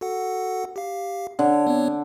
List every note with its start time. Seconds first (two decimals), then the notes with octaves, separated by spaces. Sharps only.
0.01 F#4 A4 F#5
0.76 G4 F5
1.39 D3 C#5
1.67 B3 C4 C#5